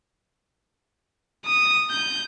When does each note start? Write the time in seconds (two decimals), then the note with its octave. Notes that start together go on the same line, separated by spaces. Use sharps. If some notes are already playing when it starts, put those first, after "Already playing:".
1.46 D#6
1.91 G6